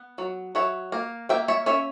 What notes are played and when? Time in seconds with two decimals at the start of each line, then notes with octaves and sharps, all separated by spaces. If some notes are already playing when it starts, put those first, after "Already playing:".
Already playing: B3
0.18 F#3
0.55 F#3 C#5 E5
0.92 A#3
1.29 A#3 E5 G5
1.48 C#5 E5
1.66 C#4 C#5 E5